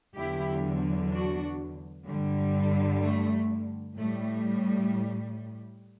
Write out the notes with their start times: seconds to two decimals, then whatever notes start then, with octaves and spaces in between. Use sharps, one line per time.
0.16 E2 D3 F#3 E4 G4
1.12 D4 F#4
2.07 G2 D3 G3
3.03 A3
3.97 A2 G3 A3